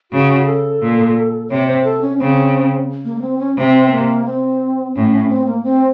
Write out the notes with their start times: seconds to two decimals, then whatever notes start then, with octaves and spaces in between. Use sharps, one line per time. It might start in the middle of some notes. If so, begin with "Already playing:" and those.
0.11 C#3 F#4
0.46 A4
0.81 A#2
1.50 C3 C#5
1.67 C5
1.84 A4
2.02 C#4
2.19 C#3 C4
3.05 A#3
3.16 A#3
3.22 C4
3.39 C#4
3.56 C3 C4
3.91 A#3
4.26 C4
4.94 A2 C#4
5.12 C#4
5.29 C4
5.46 A#3
5.63 C4